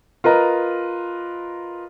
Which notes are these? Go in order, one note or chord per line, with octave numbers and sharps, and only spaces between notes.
F4 A#4 B4 D#5 A#5